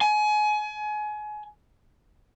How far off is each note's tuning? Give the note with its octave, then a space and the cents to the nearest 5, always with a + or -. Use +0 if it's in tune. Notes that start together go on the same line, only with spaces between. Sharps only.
G#5 +30